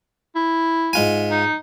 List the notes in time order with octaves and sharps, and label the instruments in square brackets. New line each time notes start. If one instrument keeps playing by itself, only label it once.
[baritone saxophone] E4
[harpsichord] G#2 F4 G#5
[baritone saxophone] D#4